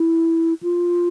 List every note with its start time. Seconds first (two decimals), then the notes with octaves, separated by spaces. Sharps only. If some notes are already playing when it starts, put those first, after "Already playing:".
Already playing: E4
0.63 F4